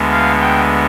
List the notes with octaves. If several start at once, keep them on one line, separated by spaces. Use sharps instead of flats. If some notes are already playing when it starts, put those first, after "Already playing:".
Already playing: D2 D3 G#3 B3
F5
G5